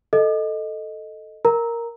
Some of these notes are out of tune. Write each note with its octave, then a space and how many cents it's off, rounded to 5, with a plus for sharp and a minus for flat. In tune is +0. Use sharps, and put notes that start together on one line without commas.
A4 +0 D#5 +0
A#4 +0 A#5 +0